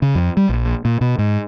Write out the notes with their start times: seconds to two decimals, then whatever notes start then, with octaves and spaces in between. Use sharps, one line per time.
0.02 C#3
0.15 F2
0.37 G3
0.49 A#1
0.85 A#2
1.01 B2
1.19 G#2